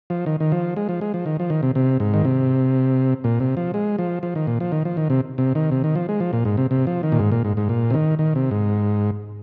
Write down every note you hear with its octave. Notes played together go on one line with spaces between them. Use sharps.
F3
D#3
D#3
F3
G#3
F3
G#3
F3
D#3
F3
D#3
C3
C3
G#2
D#3
C3
A#2
C3
F3
G#3
F3
F3
D#3
A#2
F3
D#3
F3
D#3
C3
C3
D#3
C3
D#3
F3
G#3
F3
A#2
G#2
C3
C3
F3
D#3
A#2
G#2
A#2
G#2
G#2
A#2
C3
D#3
D#3
C3
G#2